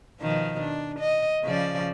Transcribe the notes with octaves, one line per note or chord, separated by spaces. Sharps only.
B2 D#3 F3
D4
D#5
C#3 F3 D5